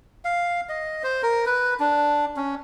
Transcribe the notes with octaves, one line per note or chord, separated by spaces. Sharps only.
F5
D#5
C5
A#4
B4
D4
C#4